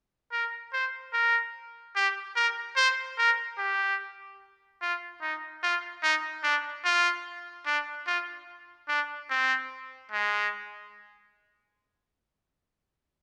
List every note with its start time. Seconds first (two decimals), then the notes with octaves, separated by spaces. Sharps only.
0.32 A#4
0.73 C5
1.13 A#4
1.96 G4
2.36 A#4
2.77 C5
3.19 A#4
3.58 G4
4.82 F4
5.22 D#4
5.63 F4
6.03 D#4
6.44 D4
6.84 F4
7.66 D4
8.07 F4
8.88 D4
9.30 C4
10.12 G#3